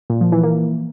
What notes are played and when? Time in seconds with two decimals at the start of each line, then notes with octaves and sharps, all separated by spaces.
0.10 A#2
0.21 F3
0.32 E3
0.43 A#3